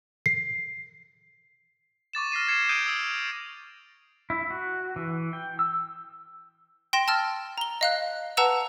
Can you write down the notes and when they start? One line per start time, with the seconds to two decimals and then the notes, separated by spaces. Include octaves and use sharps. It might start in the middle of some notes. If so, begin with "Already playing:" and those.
0.26 C7
2.13 C#6 D6 A6 E7
2.32 F6 A#6 C7 D#7
2.48 F6 G#6 C7 C#7 E7
2.69 D#6 G6 G#6 D7 D#7 G7
2.86 D#6 E6
4.30 E4
4.50 F#4
4.96 E3
5.33 G5
5.59 E6
6.93 G5 C6 A#6 E7
7.08 A5 E6 F6 A6
7.58 A#5 G7
7.81 D#5 F5 F#6
8.37 B4 F#5 A5 A#5 E6 F7